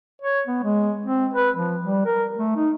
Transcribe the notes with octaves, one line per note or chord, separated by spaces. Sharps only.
C#5
B3
G#3
C4
B4
F3
G3
A#4
A3
D#4